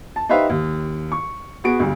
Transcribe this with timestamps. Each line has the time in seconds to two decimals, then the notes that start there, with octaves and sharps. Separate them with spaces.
0.16 A5
0.29 D#4 G4 B4 C5 E5 F5
0.50 D#2
1.12 C#6
1.64 B3 F#4 G#4 D7
1.79 D2 G2